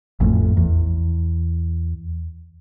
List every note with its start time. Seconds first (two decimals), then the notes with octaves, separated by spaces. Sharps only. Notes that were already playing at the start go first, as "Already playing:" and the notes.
0.20 A1 F2 A2
0.57 E2